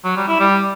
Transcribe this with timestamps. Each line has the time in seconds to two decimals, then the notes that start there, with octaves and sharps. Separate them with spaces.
0.04 F#3
0.16 G3
0.28 E4
0.40 G3